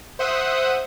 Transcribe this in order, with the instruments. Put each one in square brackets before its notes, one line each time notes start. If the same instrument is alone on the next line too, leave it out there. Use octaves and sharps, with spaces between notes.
[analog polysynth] C5 E5 F#5 D#6